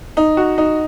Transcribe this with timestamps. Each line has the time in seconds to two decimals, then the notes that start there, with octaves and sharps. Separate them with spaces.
0.17 D#4
0.37 F#4
0.58 D#4